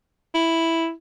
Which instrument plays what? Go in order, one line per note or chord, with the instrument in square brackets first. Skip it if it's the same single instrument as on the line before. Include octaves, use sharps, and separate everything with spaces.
[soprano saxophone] E4